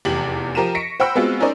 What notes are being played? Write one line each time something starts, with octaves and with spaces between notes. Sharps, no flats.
F1 E2 G4 F#7
F3 G4 A#4 A#5 D#7 E7
C#6 A#6 B6 C#7 D7
C5 F#5 G5 B5 E6
G#3 B3 C4 F4 F#4
C#4 D#4 A#4 C5 D5